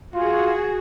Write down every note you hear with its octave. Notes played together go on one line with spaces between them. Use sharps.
F4 F#4 G#4